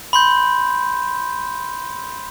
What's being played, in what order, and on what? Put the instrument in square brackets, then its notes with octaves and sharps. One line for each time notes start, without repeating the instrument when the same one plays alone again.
[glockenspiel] B5 C6 G6